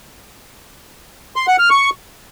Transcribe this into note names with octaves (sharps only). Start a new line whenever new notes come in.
C6
F#5
F6
C#6